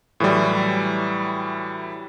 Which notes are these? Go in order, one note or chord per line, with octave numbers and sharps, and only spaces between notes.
A2 E3 F#3 G3